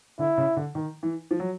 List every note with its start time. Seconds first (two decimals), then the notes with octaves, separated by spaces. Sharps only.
0.19 D3 E4
0.38 C#3
0.57 D3
0.75 D#3
1.03 E3
1.31 F3
1.40 F#3